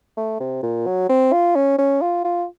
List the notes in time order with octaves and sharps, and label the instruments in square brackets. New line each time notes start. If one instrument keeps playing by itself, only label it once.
[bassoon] A3
C3
A#2
F#3
C4
F4
C#4
C#4
F4
F4